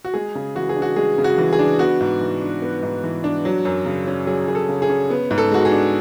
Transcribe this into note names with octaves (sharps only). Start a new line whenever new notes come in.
F#4
G#3 G#4
C#3
E3 F#4
G#4
D4
F#4
G#3 G#4
C#3
F#4
E3
G#4
D4
B3 F#4
G#2
E3
D4
B3
G#2
E3
D4
F#3
F#2
C#3
C#4
F#3 G#4
F#2 G#4
A4
C#3
G#4
C#4
B3
G#2
A4
G#3 F#4
G#4
D4